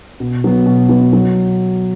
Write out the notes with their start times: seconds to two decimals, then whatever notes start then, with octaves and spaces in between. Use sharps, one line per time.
0.20 B2
0.44 F#3 B3
0.66 B2
0.89 F#3 B3
1.13 F#3